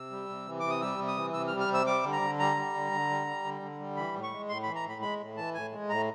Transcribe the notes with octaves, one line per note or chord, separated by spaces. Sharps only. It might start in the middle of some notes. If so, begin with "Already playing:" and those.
Already playing: C3 E6
G3
C3
E3
C3 D6
D#6
G3 E6
C3
D#6
E3
C3 E6
F6
G3
F6
C3
E6
G3 D6
D3
A#5
D3
G3 A#5
G3
D3
D3
G3
G3
D3
D3
G3
E3 B5
A2
C#6
G#3
A2 C6
E3 B5
A#5
A2 B5
G#3 B5
A2
E3 A5
A2 G#5
G#3
A2 A#5